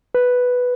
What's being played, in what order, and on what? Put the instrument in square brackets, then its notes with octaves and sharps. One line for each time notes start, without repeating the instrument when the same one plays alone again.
[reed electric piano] B4